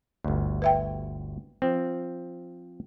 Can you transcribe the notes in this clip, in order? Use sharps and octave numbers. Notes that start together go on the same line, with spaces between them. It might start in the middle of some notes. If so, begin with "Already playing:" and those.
G1 D2
B4 E5 G5
F3 C4